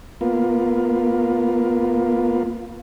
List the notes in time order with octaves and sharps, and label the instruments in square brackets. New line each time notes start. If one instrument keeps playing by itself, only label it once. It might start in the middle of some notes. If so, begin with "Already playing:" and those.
[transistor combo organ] A#3 B3 F4